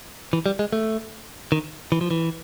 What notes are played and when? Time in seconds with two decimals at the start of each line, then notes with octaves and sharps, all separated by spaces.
0.33 E3
0.46 G3
0.59 G#3
0.73 A3
1.52 D#3
1.92 E3
2.01 F3
2.11 E3